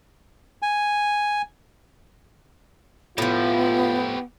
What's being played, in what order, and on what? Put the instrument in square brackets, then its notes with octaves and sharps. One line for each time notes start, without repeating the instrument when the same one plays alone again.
[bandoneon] G#5
[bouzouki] A2 F3 [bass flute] B3 [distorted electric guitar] E4 G4 [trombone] F4